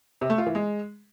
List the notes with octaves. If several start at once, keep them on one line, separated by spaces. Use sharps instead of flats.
C3
A3
F4
E3
G#3